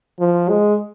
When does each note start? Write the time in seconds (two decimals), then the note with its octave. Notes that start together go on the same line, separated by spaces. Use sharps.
0.20 F3
0.49 G#3